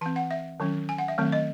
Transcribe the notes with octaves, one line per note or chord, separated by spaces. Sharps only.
E3 C4 A5
F#5
E5
D#3 F#3 C#4
G#5
F#5
E5
D#3 F#3 A3 C4
D#5